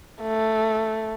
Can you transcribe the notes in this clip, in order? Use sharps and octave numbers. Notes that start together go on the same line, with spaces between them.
A3